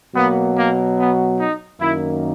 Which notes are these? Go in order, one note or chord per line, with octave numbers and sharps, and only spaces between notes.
B2 F#3 A#3 B3
A#3
B3
D#4
F#2 D#3 A#3 E4